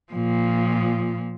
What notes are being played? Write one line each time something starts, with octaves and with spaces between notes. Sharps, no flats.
A#2 F3